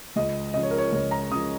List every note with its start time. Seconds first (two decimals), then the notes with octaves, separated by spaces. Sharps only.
0.16 C#2 D#5
0.54 C#3 F3 D#5
0.63 C#5
0.71 A#4
0.78 C#5
0.92 C#2 C#5
1.11 A#5
1.30 C#3 F3 D#6